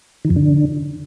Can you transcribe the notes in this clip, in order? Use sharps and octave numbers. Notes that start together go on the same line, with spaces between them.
D#3
F2
D3